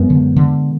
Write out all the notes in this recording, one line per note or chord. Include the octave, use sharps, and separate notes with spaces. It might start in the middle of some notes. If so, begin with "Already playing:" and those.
Already playing: F#2 G#3 B3
D3
D3